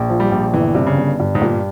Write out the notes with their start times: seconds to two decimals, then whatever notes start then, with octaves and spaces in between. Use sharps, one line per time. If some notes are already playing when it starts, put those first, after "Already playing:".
Already playing: A#1
0.09 F3
0.20 G3
0.32 A#1
0.53 G1 E3
0.75 G2 C3
0.87 C#3
0.97 G1
1.20 G2
1.35 G#2
1.42 G2 A#2